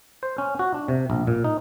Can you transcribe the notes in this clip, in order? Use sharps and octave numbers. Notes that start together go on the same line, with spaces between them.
C5
C#4
F#4
D4
C3
A#1
A#2
D#4